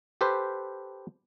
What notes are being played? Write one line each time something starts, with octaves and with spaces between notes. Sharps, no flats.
G4 A4 B4 C5